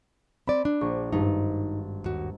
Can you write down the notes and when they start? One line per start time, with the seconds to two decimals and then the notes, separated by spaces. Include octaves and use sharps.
0.47 C4 D5 B5
0.65 D4
0.81 A#1 C#6
1.13 G#1 G2 D#4
2.04 D#2 F#4